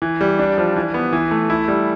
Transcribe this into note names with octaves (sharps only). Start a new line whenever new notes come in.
E3
G3
D4
F3
E3
B3
E3
A3
E4
G3